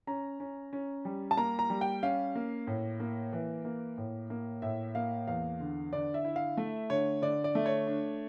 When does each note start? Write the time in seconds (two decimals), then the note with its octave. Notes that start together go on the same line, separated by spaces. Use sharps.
0.07 C#4 A#5
0.40 C#4
0.73 C#4
1.05 G3
1.31 A5
1.37 A#3 A#5
1.59 A#5
1.70 G3
1.81 G5
2.03 C#4 F5
2.35 A#3
2.67 A2
3.00 A#3
3.33 E3
3.65 A#3
3.98 A2
4.30 A#3
4.62 A2 E5
4.95 A#3 F5
5.27 E2 F5
5.60 D3
5.93 D3 D5
6.14 E5
6.25 E4
6.36 F5
6.57 A3 E5
6.90 D3 C#5
7.22 D3 D5
7.44 D5
7.55 A3
7.66 C#5
7.87 D4